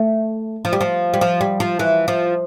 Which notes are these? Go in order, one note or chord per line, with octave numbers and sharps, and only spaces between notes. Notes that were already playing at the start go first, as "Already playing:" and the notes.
Already playing: A3
F3
G3
F3
G3
F3
G3
F3
E3
F3